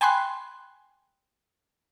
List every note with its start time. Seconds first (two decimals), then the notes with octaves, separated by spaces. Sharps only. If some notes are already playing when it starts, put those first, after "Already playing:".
0.01 G5 G#5 B5 C6 F#6